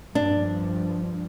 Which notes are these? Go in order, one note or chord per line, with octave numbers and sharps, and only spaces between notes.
G2 F3 D4